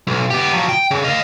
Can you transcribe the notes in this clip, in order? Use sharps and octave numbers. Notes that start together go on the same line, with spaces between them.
B1
B3 G4
F3 F#3
G5
C#3
D#5 F5